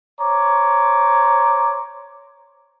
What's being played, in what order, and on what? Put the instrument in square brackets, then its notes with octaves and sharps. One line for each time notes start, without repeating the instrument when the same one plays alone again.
[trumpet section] C5 C#5 A#5 D6